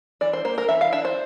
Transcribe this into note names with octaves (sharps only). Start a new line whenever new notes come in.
E3 D5
C5
A#3 C5
A#4
E3 E5
F5
D4 E5
C5